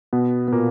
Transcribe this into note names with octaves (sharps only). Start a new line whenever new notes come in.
B2 B3
B3
A#2 A#3